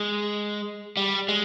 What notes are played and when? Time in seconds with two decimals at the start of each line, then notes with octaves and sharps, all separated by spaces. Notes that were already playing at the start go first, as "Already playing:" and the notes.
Already playing: G#3
0.97 G3
1.29 G#3